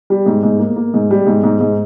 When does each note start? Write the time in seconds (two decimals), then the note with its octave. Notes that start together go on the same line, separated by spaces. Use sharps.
0.10 G3
0.26 G#2
0.43 G#2
0.59 A#3
0.76 A#3
0.94 G#2
1.11 G3
1.26 G#2
1.44 G#2
1.61 G#2